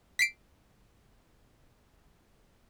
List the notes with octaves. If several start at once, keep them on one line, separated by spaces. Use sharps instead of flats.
B6 C7 D7